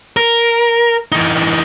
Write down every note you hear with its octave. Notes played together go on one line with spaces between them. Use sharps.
A#4
E3 D#4